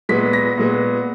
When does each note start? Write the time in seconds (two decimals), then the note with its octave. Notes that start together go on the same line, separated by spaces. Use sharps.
0.09 A#2 G#3 B3 B6
0.33 A#6
0.58 A#2 G#3 B3